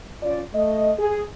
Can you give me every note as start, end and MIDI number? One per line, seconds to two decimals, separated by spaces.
0.23 0.42 61
0.23 0.42 65
0.23 0.42 74
0.54 0.92 57
0.54 0.92 75
0.98 1.25 68